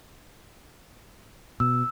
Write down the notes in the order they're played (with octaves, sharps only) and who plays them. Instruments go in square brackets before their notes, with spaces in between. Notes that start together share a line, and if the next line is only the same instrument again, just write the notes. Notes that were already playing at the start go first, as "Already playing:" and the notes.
[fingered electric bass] B2 [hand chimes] E6